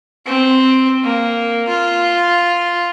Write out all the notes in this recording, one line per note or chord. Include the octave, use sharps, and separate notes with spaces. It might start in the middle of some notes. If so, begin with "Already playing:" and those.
C4
A#3
F4